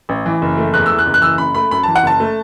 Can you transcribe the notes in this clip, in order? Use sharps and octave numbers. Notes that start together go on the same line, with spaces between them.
A1
E3
F#1
A3
E2 F#6
E3 E6
F#6
F#1
F#6
E3 E6
F#1 B5
A3 B5
F#2 B5
A5
E3
F#5
F#1 A5
A3